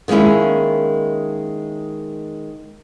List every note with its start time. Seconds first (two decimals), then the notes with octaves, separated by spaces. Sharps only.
0.08 D#3 G#3 A#3 C#4 E4